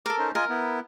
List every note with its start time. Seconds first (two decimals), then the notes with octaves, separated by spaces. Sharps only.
0.06 A4 A#4 D6
0.18 C#4 D#4 C5
0.35 F4 A#4 D#5 G#5
0.49 B3 E4